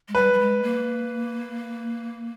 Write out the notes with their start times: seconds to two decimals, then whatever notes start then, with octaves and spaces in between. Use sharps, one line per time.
0.08 G#3
0.15 G3 B4
0.33 G3
0.39 G#3
0.62 A#3